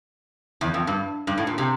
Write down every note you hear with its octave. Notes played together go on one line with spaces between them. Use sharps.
E2
F2
G2
G2
A2
A#2
C3